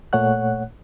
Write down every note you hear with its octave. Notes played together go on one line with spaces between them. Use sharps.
A#2 A3 C#5 F#5 F#6